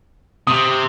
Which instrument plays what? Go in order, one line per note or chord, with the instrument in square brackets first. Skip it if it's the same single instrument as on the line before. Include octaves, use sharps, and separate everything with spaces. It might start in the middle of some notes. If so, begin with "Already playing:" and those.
[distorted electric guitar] C3 [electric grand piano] D#6